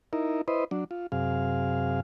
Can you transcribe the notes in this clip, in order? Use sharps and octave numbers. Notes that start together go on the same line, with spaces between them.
D#4 E4 A#4
E4 B4 C5 D#5
F#3 D4
F4
F#2 C3 G#4 F5